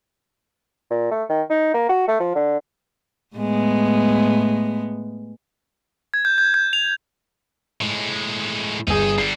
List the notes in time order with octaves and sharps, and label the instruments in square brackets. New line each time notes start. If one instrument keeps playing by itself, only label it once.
[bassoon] A#2
A3
D#3
D#4
A#3
F#4
A3
F3
D3
[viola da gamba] A2 G#3 B3
[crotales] G#6
G6
G6
G6
F7
[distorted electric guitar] A2 G#3
[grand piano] G1 G#4 [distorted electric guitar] D#5 G5
[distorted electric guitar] D3 G3 [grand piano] C7